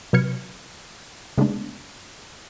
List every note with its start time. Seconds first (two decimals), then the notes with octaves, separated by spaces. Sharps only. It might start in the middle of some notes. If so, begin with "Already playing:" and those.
0.13 C3 F#3 B4 F6 G#6 C#7
1.38 C#3 G#3 A3 B3 D4 D#4